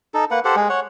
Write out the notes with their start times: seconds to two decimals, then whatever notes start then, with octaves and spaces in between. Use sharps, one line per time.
0.14 D#4 A4
0.31 A#3 B4 F#5
0.45 G4 A4 C5 F#5
0.56 G#3 G#4
0.69 C#5 F#5